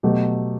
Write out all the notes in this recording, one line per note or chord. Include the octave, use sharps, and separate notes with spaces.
B2 F#3 A3 G4